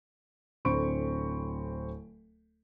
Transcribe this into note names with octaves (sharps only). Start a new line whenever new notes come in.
D1 D3 C4 B5 C#6 D7